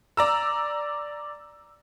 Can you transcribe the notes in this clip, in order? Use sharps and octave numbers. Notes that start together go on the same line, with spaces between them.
D5 A#5 E6